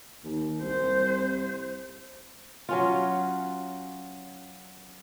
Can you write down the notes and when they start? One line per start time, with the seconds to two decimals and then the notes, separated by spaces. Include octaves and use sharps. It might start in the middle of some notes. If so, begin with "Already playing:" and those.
0.24 D#2
0.62 C2 C5
2.69 F#3 C#4 F4